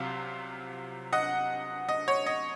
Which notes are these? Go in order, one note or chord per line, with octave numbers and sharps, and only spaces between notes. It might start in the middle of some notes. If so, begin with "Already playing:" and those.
Already playing: C2 C3 F#3 C4 F4 F5
D#5 F#5
D#5
C#5
D#5